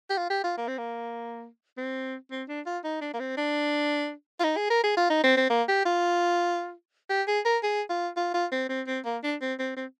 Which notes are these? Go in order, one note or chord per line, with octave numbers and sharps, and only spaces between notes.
G4
F4
G4
F4
A#3
C4
A#3
C4
C4
D4
F4
D#4
D4
A#3
C4
D4
F4
D#4
G#4
A#4
G#4
F4
D#4
C4
C4
A#3
G4
F4
G4
G#4
A#4
G#4
F4
F4
F4
C4
C4
C4
A#3
D4
C4
C4
C4